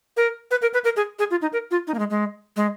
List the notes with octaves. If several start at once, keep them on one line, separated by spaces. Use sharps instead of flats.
A#4
B4
A#4
B4
A#4
G#4
G#4
F4
D#4
A#4
F4
D#4
A#3
G#3
G#3
G#3